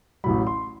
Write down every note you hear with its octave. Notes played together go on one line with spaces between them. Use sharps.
A1 A2 F#3 B5
C6